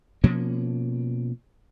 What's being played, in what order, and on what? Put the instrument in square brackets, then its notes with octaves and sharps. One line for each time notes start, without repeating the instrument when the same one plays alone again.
[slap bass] B2 F3 A#3 C#4